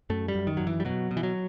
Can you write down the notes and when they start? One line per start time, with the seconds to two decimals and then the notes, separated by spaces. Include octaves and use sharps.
0.10 F#2 A3
0.28 G3
0.35 F#2
0.47 D#3
0.57 F#2 F#3
0.67 E3
0.80 G3
0.85 B2 F#3
1.11 B2
1.17 E3
1.23 F#3